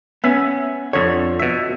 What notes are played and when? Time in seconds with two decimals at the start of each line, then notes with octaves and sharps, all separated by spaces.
0.24 B3 C#4 E5
0.93 F2 D3 C#5
1.40 B2 E5